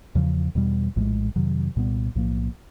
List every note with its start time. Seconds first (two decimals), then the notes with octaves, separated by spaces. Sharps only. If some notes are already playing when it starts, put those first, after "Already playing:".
0.15 E2 C#3 F3
0.55 E2 B2 G3
0.96 A#1 A2 E3 G#3
1.36 F2 C3 D#3 F#3
1.76 C2 A#2 G3 B3
2.15 B1 A2 F3 A#3